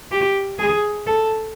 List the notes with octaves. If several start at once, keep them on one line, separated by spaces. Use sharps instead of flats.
G4
G#4
A4